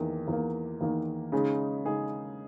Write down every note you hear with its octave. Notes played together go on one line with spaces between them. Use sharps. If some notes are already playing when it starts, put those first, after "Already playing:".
Already playing: E2 D#3 A#3
E2 D#3 A#3
E2 D#3 A#3
C#3 G#3 D#4 G#4
C#3 G#3 D#4 G#4